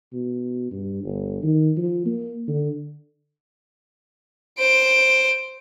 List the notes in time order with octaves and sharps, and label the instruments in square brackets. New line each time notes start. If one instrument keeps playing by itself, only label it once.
[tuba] B2
G2
G1
D#3
F3
A#3
D3
[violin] C5 D7